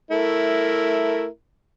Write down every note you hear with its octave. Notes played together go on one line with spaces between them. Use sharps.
A3 E4 A#4